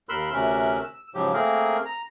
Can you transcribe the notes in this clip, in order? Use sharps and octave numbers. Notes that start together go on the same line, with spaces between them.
D#2 A#4 B5 C6 E6 F#6
D2 C3 C#4 A#4 E5 F#6
E6
G#2 C#3 F3 F#3 G4
A3 A#3 C4 G#4 A#4
A#5